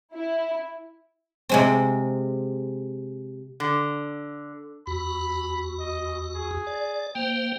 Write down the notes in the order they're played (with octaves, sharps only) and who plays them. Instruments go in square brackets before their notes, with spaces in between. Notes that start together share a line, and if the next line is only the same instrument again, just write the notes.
[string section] E4
[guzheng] C3 G#3 C4
[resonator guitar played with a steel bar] D3
[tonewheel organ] E2 F#4 [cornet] B5
[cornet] D#5
G#4
[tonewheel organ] D5
[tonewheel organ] A#3 C5 [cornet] G5